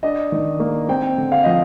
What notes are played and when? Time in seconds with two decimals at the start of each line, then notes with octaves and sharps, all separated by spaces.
0.03 D4 D#5
0.32 D#3
0.60 A#3
0.89 C4 G5
1.18 D3
1.32 F5
1.44 F3 D#5